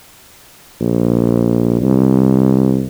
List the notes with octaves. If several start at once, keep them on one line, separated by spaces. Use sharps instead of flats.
A#1
C2